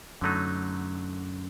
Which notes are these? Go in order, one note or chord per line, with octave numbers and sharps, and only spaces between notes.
F#2 D3 F#3 A3 D#4